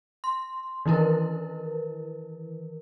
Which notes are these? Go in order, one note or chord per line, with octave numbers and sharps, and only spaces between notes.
C6
D#3 E3 E4 A#4 B4